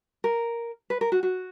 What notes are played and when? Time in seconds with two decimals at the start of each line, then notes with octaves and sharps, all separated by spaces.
0.24 A#4
0.90 B4
1.01 A#4
1.12 F#4
1.23 F#4